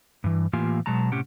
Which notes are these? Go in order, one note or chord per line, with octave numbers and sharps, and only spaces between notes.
G2 E3
A2 E3 A#3 F4 G4 G#5
B2 F#3 G#3 A5 A#5
A2 C3 C#4 G4 F#5